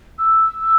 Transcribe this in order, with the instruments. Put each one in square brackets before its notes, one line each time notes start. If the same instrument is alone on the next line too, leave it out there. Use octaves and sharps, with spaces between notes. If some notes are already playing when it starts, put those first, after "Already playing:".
[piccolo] E6